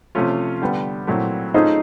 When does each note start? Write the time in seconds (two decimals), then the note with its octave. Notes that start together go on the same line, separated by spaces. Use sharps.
0.15 C3 F3 A3 C#4 F4
0.62 D3 G3 B3
1.07 A#2 F#3 A3 C4 E4
1.54 A3 C#4 D#4 F4 G#4 C5